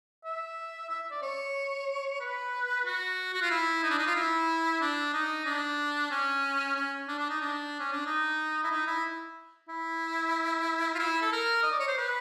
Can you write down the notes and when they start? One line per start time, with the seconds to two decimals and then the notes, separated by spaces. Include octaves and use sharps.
0.24 E5
0.89 E5
1.11 D5
1.22 C#5
2.20 B4
2.85 F#4
3.34 F#4
3.42 F4
3.50 E4
3.83 D#4
3.90 D4
3.98 D#4
4.07 F4
4.15 E4
4.81 D4
5.13 D#4
5.45 D4
6.10 C#4
6.75 C#4
7.08 D4
7.19 D4
7.29 D#4
7.41 D4
7.80 C#4
7.92 D4
8.06 D#4
8.64 E4
8.71 D#4
8.87 E4
9.68 E4
10.94 F4
10.99 E4
11.21 A4
11.32 A#4
11.63 D#5
11.72 D5
11.79 C#5
11.88 C5
11.97 B4